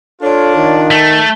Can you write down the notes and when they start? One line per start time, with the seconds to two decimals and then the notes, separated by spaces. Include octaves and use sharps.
0.22 D4 F4 A4 C#5
0.56 D#3
0.91 A3 A5